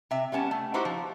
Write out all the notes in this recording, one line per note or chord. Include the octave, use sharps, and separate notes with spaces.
C3 E5
G3 B3 C#4 A5
A3
D#4 E4 F#4 G4 B4 C5
F3